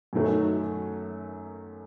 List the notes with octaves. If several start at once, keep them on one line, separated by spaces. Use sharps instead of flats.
F#2 D#3 F#3 A3